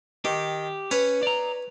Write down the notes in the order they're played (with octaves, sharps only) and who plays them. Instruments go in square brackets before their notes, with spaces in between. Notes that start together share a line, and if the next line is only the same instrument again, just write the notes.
[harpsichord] D#3 [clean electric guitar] G4
[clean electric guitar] C#4 [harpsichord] B4 C#5
[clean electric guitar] D5 A#5